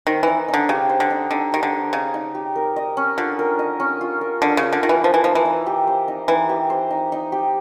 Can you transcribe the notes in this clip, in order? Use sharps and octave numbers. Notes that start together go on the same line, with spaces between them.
D#3 C5
E3 D#4
D#4
D3
C#3 G4
C5
D3
D#4
D3 D#4
D#3 G4
D3
C5
C#3 D#4
D#4
G4
A#4
D#5
C#4
D3 F4
A#4
D#5
C#4
F4
A#4
D3 D#5
C#3
C#4
D3
D#3 F4
E3
F3 C5
E3
F3 D#4
E3
D#4
G4
C5
D#4
E3 D#4
G4
C5
D#4
D#4
G4